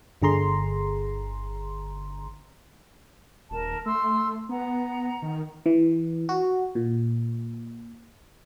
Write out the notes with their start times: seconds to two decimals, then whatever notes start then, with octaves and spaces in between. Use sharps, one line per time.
0.22 G1 D3 G#4 A#5 C6
3.51 D#1 A#4 A5
3.86 A3 C6 E6
4.49 B3 F#5 A#5
5.22 D#3
5.66 E3
6.29 F#4
6.75 A#2